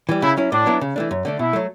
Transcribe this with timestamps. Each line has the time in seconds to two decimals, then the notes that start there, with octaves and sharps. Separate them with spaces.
0.09 E3 G3
0.22 C#3 E4
0.37 F#3 C#4 E4
0.52 A2 D4
0.66 F#3 B3 E4
0.81 C#3
0.96 E3 A3 D4
1.11 F#2
1.25 D3 A3 D4
1.39 B2 E4
1.53 F#3 A3